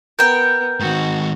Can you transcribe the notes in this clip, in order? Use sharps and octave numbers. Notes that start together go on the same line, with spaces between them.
B3 A#4 G5 G6
G#2 D#3 F#4